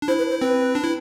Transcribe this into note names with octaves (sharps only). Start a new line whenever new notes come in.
D4
E4 C5
B4
C5
C4 B4
D4
E4